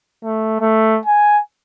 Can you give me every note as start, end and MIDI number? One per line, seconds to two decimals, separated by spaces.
0.24 0.60 57
0.61 0.99 57
1.05 1.40 80